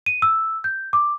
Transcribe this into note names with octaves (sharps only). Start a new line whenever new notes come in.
D#7
E6
G6
D6